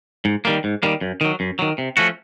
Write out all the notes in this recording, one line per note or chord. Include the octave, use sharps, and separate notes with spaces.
G#2
D#3 G3 A#3
G#2
D#3 G3 A#3
F#2
D#3 F#3
F#2
D#3 F#3
C3
F3 A3 C#4 F#4